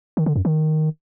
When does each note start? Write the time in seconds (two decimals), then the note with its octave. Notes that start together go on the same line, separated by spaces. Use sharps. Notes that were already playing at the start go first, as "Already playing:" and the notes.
0.17 D#3
0.26 D3
0.36 F#2
0.45 D#3